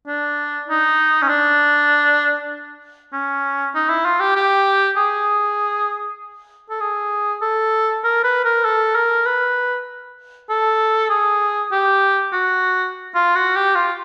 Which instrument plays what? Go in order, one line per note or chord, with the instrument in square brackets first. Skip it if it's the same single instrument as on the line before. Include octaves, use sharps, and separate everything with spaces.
[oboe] D4
D#4
C#4
D4
C#4
D#4
E4
F4
G4
G4
G#4
A4
G#4
A4
A#4
B4
A#4
A4
A#4
B4
A4
G#4
G4
F#4
F4
F#4
G4
F4